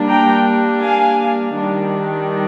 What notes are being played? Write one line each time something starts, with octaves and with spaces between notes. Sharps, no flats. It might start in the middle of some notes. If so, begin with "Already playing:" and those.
Already playing: G3 A#3 D4
G5 A#5
F5 G#5
D#3 G3 D4